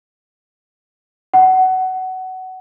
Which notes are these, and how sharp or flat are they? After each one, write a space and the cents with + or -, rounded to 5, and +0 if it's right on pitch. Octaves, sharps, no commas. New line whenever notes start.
F#5 +20